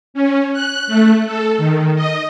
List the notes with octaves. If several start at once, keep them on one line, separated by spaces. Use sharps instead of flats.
C#4
F#6
A3
A4
D#3
D#5